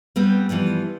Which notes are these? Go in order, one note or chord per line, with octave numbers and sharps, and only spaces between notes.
G3 B3 C4 G4
E3 F3 G3 B3